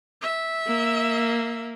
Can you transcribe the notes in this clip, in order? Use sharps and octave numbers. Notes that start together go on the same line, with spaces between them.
E5
A#3